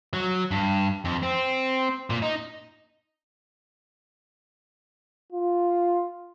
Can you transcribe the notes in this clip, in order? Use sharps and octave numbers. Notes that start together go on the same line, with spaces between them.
F#3
G2
F2
C4
A#2
D#4
F4